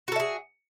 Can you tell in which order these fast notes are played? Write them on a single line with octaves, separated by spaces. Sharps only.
F#4 A4 E5 G#4